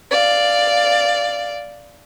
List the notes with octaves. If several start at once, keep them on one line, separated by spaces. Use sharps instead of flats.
D5 F5